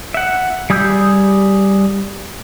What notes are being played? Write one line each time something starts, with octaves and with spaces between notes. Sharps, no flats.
E5 F#5
G3 G#4 D#6 E6 G6